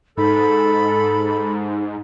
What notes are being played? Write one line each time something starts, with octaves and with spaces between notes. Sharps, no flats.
G#2 D#4 A4 B5